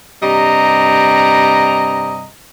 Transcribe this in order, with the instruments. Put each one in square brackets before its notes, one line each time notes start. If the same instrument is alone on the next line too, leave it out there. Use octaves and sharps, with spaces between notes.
[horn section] G2 C3 G3 D#5 A#5